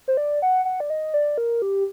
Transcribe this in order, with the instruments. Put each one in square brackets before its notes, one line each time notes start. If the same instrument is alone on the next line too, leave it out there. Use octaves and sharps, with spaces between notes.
[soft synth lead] C5
D5
F#5
F#5
D5
D#5
D5
A#4
G4